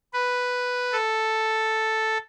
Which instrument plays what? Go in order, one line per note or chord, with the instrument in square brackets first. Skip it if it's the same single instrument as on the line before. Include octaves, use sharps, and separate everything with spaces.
[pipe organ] B4
A4